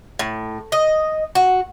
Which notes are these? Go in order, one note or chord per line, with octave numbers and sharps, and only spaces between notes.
A2
D#5
F#4